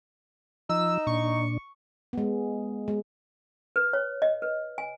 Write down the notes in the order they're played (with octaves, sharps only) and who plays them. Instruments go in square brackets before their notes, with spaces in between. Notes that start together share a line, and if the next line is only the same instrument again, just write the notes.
[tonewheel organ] F3 [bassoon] D#4 [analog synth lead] E6
[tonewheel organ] A#2 D4 [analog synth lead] C#6
[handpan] G#3 B3
G#3
[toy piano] B4
C#5
D#5
B4
G#5